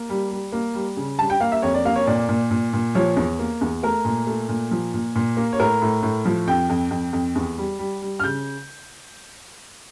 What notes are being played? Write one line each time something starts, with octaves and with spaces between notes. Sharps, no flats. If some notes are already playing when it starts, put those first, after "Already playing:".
Already playing: A#3
G3
G3
A#3
G3
C#3
G3 A5
G5
A#3 F5
E5
F2 C#5
D5
A#3 F5
C#5
A#2 D5
A#2
A#2
A#2
F3 C#5
E2
A#3
E2
A3 A#4
A#2
A3
A#2
F3
A#2
A#2
A#3
C#5
A2 A#4
A2
A2
F3
F2 G5
F2
F2
F2
E2
G3
G3
G3
F6
C#3 G6